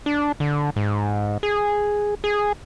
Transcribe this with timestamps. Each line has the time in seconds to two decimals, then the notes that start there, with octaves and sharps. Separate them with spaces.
0.06 D4
0.40 D3
0.76 G#2
1.43 G#4
2.24 G#4